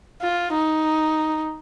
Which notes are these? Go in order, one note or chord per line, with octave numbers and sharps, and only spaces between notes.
F4
D#4